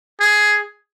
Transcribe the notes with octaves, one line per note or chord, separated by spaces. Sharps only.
G#4